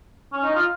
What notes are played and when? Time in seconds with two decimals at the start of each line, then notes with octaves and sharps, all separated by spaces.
0.33 C#4
0.44 D#4
0.55 F4